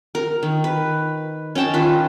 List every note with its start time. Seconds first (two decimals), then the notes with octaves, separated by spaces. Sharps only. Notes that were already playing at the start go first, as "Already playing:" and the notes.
0.15 A#4
0.43 D#3
0.64 B4
1.55 C#4 D#5 G5 A5
1.74 D#3 F4 B4 B5